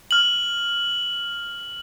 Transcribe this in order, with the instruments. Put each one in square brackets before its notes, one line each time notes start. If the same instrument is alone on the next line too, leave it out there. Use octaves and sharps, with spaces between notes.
[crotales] F6 F#7